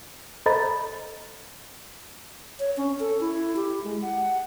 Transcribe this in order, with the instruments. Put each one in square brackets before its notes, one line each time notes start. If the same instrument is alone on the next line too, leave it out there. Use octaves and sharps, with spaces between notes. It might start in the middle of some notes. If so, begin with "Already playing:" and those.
[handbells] A4 C5 D#5 A#5 B5 A6
[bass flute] C#5
C#4
A4
E4
G4
G#3
F#5